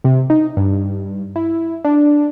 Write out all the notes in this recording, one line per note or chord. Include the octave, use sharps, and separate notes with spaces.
C3
D#4
G2
E4
D4